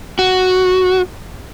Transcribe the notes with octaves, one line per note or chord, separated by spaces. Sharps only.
F#4